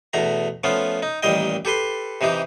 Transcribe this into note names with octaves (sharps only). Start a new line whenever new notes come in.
E2 B2 A3 A#5
F3 A3 B3 C#4 F4
D#4
A1 A#2 D#3 G3 D#5 G5
G4 A4 B4 C6
C3 E3 D#4 G4